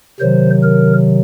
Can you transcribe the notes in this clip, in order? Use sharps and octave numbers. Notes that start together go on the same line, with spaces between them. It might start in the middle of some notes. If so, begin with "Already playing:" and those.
C3 D#3 F#3 C5
A#4